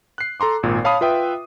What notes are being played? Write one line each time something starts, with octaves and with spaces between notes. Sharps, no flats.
F#6 C7
A4 A#5 C6 D6
G#1 A#2
C#5 F5 A5 B5 D#6
F4 B4 E5 G5 D#6